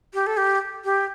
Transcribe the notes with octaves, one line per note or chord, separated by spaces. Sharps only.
G4
A4
G4
G4